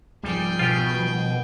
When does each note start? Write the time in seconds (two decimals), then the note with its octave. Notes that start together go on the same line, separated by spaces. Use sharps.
0.23 C2 G#2 F3 G3 G#4 G5
0.59 B2 F4 G4
0.97 D#3 F3 G3